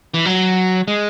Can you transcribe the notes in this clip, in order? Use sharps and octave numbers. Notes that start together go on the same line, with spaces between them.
E3
F#3
G#3